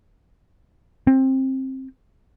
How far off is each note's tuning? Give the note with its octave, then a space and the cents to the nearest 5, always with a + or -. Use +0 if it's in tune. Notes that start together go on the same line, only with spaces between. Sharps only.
C4 +20